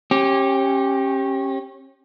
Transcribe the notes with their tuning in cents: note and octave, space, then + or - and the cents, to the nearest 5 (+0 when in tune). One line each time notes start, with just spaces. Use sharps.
C#4 -30 G4 +0